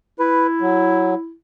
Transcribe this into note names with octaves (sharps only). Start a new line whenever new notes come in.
E4 B4
F#3